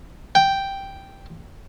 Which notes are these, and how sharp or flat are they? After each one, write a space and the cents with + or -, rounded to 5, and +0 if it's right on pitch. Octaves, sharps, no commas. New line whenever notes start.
G5 +0